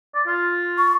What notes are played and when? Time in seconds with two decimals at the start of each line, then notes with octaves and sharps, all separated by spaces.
0.15 D5
0.27 F4
0.78 C#6